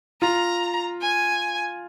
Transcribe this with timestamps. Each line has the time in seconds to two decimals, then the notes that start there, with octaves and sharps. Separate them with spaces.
0.22 F4 A#5
1.02 G#5